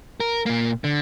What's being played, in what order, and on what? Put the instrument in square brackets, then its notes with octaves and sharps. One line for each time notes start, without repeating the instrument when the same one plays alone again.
[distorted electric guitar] A#4
A#2 A#3
D3